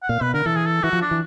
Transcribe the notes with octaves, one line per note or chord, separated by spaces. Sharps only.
F#5
A#2 F5
B2 B4
D3 A#4
E3 A4
G#4
A4
E3 F#4
F3
D4
E3